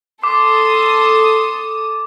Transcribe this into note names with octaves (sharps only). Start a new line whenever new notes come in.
A4 C6 D6 D#6